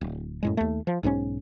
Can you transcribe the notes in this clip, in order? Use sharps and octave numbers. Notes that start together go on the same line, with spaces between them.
D1
F#2 A2 G#3
D#2 A3
F3
B1 G#2 G#3 C#4